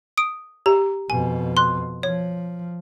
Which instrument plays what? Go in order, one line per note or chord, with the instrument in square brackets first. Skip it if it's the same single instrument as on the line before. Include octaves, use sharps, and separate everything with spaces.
[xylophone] D#6 D7
[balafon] G4 [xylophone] A#5
[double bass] F2 B2 [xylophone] G#5
[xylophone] C6 F#6
[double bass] F3 [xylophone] C#5